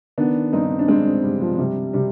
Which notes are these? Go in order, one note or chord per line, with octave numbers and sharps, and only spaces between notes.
D#3 B3 D4
G2 C4 D#4
D4
G2 G#3 C4
G2 G3
F3
C3 G3
C3 G3